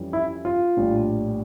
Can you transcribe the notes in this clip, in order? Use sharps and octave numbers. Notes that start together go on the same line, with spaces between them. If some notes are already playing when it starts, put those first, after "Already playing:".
Already playing: F2 E3 G3 C#4
E4
F4
A#1 A2 G3 D4